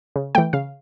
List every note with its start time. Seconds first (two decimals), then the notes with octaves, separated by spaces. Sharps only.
0.16 C#3
0.35 E3 A3 G5
0.53 C#3 F5